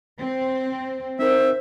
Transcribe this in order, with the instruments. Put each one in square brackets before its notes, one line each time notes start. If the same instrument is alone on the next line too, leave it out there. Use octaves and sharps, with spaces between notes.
[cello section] C4
[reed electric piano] C4 D#4 A#4 [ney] C5 [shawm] E5